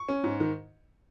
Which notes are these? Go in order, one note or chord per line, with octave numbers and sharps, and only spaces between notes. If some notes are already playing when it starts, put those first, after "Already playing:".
Already playing: C#6
C#4
G#2
D#3